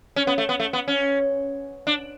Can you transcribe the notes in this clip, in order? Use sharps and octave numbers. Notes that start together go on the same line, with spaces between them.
C#4
B3
A3
B3
A3
B3
C#4
D4